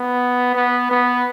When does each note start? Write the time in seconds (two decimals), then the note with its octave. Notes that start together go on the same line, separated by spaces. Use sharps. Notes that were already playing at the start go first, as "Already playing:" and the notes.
Already playing: B3
0.55 B3
0.91 B3